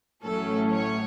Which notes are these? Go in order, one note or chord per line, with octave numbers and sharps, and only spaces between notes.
A1 A2 F#3 A3 C#4 A4
C#5